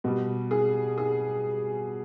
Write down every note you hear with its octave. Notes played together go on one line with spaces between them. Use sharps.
B2 G3
G#4
G#4